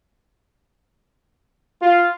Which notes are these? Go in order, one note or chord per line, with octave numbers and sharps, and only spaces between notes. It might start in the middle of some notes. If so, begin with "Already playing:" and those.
F4